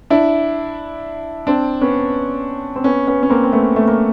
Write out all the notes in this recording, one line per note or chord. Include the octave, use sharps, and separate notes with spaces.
D4 E4
C4 D4
B3 C#4
C4
B3 C#4
B3 C#4
C#4
A#3 C4
C4
A3 B3
A3
A#3